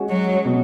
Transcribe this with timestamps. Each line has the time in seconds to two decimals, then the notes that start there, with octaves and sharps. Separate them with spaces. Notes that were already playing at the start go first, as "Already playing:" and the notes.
Already playing: G#3 C#4 F#4
0.09 F#3
0.45 B2 B3 F#4